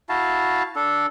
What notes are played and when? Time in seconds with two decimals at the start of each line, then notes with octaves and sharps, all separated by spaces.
0.09 E4 F#4 F5 A5
0.76 D4 A4